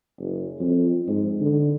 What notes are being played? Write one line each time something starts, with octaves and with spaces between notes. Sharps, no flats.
F#1
F2
G#2
D3